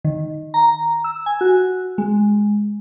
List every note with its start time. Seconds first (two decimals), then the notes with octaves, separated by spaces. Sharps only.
0.05 D#3
0.54 A#5
1.04 E6
1.26 G#5
1.41 F#4
1.98 G#3